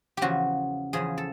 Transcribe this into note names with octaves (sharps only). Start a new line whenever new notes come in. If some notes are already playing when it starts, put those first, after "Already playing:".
E2 C#3 F3 F#4 G4
E2 C#3 F3 G#4
A4